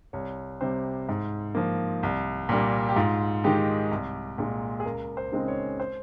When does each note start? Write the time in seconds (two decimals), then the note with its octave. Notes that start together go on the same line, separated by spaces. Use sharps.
0.13 C2 C#5
0.61 C3 G3 C5
1.09 G#2
1.55 F3 A#3
2.03 C2
2.49 A#2 G3 A#3
2.89 G4
2.96 G#2 F4
3.44 D#3 G#3 D#4 G4
3.91 C2
4.38 A#2 G#3
4.80 G#4
4.85 C#2 A#4
5.17 C5
5.32 C#3 G#3 C4 D#4
5.48 C#5
5.80 C5